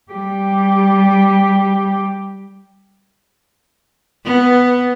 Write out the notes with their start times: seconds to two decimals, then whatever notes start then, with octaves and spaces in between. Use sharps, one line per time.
0.12 G3 G4
4.25 B3